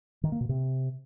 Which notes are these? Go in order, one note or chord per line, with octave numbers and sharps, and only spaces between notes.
D#3
A#3
B2
C3